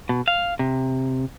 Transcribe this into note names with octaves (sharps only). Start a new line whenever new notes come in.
B2
F5
C3